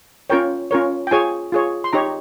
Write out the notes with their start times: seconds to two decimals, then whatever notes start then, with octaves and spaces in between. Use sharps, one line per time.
0.30 C#4 F4 A#4 C#5 G5
0.71 C#4 F4 A#4 C#5
1.07 G5
1.11 F4 G#4 C#5 G#5
1.52 F4 G#4 C#5
1.84 C6
1.93 D#4 G4 C#5 A#5